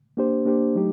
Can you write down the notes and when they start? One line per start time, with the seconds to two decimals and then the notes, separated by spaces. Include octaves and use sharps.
0.17 A#3 D4 G4 C5
0.45 A#3 D4 G4 C5
0.75 F#3 A3 D#4 G4